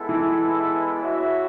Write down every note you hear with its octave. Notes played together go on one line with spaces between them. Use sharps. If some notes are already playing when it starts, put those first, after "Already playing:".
Already playing: G#3 B3 E4 A4 E5
E3
F#4 C#5 E5